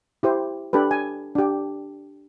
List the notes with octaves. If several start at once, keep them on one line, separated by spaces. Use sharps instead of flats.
E4 G4 C5
D4 G4 A4 B4
G#5
D4 G4